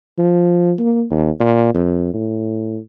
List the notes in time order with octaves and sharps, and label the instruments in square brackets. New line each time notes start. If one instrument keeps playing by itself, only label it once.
[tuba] F3
A#3
D#2
A#2
F2
A2